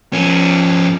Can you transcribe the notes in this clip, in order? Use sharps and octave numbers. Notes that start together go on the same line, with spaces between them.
F3 C#4